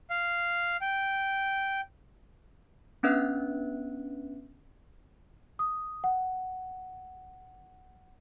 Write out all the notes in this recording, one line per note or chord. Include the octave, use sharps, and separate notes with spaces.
F5
G5
B3 C#4 D4 B4 E5 F#6
D#6
F#5